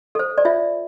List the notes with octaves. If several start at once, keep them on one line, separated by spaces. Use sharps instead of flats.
A4 C5
D5
F4 E5